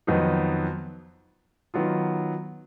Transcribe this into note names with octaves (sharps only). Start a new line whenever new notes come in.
F2 D#3 F#3 B3 D#4
D#3 F#3 B3 F4